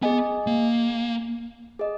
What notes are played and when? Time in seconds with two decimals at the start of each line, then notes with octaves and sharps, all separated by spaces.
0.02 B3 G#4 D#5 G#5
0.47 A#3
1.79 G#4 D#5